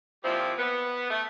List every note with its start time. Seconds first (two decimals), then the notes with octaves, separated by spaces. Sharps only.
0.24 A#2 F3 G3 C4 E4
0.58 B3
1.09 A3